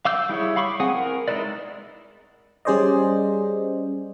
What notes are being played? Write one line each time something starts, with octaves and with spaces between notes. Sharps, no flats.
F5 D6 E6 G6
G3 E4 G#4 C#5
F5 B5 C#6 D6
C4 G#4 F#5 G#5 D#6
A#4
G#3 D#4 E4 B4 D5
G3 C#4 G#4 C5 D5 D#5